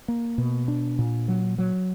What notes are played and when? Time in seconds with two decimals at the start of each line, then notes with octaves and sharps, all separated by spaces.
0.08 A#3
0.38 B2
0.68 D4
0.99 A#2
1.28 F#3
1.58 F#3